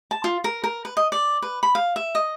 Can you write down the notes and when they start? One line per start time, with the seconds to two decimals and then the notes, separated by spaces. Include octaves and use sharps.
0.11 A5
0.24 F4
0.44 A#4
0.64 A#4
0.85 B4
0.97 D#5
1.12 D5
1.42 B4
1.63 B5
1.75 F5
1.96 E5
2.15 D#5